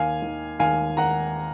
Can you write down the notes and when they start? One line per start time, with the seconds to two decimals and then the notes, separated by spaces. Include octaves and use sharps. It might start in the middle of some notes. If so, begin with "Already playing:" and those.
Already playing: D#2 F5 G#5
0.22 D#3
0.59 D#2 F5 G#5
0.97 D#3 F#5 A#5